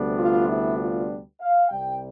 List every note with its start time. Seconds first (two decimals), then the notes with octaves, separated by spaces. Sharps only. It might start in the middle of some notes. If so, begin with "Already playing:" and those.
Already playing: D2 C3 G3 B3 D4
0.18 F4
0.48 E4
0.78 F4
1.40 F5
1.69 C2 C3 G3 G5